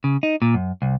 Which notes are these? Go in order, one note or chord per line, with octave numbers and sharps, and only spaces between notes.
C#3
D#4
A#2
F#2
C2